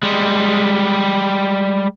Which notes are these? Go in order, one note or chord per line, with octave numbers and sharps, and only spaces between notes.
G3 G#3